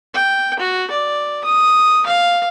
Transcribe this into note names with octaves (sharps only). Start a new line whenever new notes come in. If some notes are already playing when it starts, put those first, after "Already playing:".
G5
F#4
D5
D#6
F5